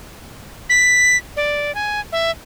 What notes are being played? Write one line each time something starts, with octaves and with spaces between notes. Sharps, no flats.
B6
D5
G#5
E5